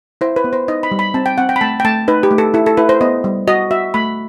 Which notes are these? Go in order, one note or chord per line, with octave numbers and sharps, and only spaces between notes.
E4 C5
B4
B3
C5
D#4 D#5
B5
G3
B5
C4 A5
G5
C4 F#5
G5
B5
A3 A5
G5
A3 A5
D#4 B4
G4
A3
A4
E4 A4
A4
E4 B4
C5
B3 D#5
G3
F#4 D#5
F#4 E5
A3 B5